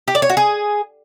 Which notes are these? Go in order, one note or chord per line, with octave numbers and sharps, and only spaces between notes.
G4
D5
C#5
F#4
G#4